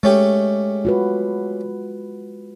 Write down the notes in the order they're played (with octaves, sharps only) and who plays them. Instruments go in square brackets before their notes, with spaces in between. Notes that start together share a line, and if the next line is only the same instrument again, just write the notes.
[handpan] G#3 [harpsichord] A3 C#4 G4
[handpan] F4 F#4 B4